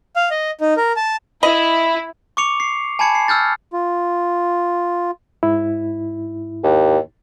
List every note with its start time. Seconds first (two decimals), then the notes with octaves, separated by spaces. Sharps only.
0.16 F5
0.31 D#5
0.61 D#4
0.77 A#4
0.96 A5
1.43 E4 D#5 B5
2.37 C#6 D6 C#7 F7
2.60 C7
2.99 G#5 A5 B5 G#6 C#7
3.15 C7
3.28 E6 F6 G6 A6
3.73 F4
5.43 G#2 E4
6.64 D#2